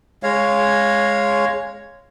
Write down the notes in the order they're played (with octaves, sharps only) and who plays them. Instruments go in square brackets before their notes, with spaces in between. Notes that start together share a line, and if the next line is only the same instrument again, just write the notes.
[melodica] G#3 C#5 F5